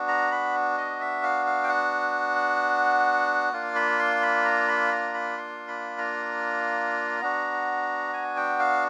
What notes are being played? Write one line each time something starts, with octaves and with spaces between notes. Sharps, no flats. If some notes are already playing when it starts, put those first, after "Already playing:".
Already playing: B3 D4 F#4
A#5
B5
D#5
E5
F5
F5
G5
F#5
A#3 D4 F4 F5
B5
C6
B5
A#5
B5
A#5
B5
C6
B5
A#5
B3 D4 F#4
G#5
G5
F5